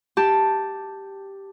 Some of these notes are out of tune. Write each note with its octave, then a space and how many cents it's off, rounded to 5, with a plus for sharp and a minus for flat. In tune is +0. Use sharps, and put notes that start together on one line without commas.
G4 +0 A5 +5